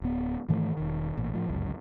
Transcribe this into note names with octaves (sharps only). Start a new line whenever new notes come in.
D1 B3
G#2 D#3 E3 A3
E1 D#3
A1 A#2
A2 F3
G1 C#2 F#2